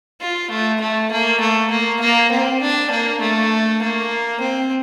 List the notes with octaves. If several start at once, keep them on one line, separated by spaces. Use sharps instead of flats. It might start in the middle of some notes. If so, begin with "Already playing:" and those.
F4
A3
A3
A#3
A3
A#3
A#3
C4
D4
A#3
A3
A#3
C4